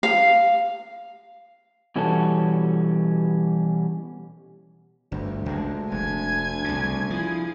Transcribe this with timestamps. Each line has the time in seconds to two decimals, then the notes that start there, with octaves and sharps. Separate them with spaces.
0.03 F5
1.96 B2 E3 G3 C#4 F#4 A4
5.12 G1 D2
5.46 C#2 G#3 D4
5.92 F1 G#5 G#6
6.64 C2 C#3
7.10 F3 E4 G#4